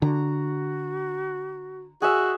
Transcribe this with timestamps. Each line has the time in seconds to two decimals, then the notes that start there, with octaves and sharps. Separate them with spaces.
0.02 D3 F#4 A#5
2.02 F#4 G#4 E5